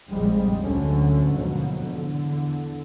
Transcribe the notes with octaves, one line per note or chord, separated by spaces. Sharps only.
F1 A#1 F2 F3 G3 G#3
D2 D3 F#3 C#4
D#2 G#2 B2 F3 F#3
E2 D3